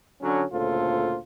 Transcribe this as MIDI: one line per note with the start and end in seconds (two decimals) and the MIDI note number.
0.22 0.44 50
0.22 0.44 54
0.22 0.44 61
0.53 1.18 38
0.53 1.18 46
0.53 1.18 49
0.53 1.18 65
0.53 1.18 69
0.53 1.18 72